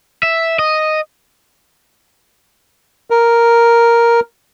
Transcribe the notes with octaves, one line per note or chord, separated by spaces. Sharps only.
E5
D#5
A#4